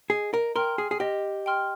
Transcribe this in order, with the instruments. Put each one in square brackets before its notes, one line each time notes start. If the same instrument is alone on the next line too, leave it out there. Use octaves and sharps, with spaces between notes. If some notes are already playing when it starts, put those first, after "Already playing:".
[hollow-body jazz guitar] G#4 [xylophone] D#5
[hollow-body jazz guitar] A#4
[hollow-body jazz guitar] A#4 [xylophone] G5 C6 F6
[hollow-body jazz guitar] G#4
G#4
[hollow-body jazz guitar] G4 [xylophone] D#5
[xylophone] G5 C6 F6